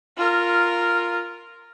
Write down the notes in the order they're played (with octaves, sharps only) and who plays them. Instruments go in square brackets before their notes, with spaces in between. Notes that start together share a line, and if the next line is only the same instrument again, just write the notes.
[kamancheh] F4 A#4